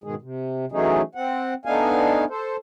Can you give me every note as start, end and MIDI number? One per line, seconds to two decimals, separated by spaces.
0.04 0.15 44
0.04 0.15 47
0.04 0.15 51
0.04 0.15 56
0.04 0.15 68
0.22 0.65 48
0.72 1.02 52
0.72 1.02 54
0.72 1.02 57
0.72 1.02 61
0.72 1.02 63
0.72 1.02 68
1.15 1.54 60
1.15 1.54 78
1.65 2.25 57
1.65 2.25 59
1.65 2.25 62
1.65 2.25 63
1.65 2.25 77
1.65 2.25 80
2.29 2.57 69
2.29 2.57 72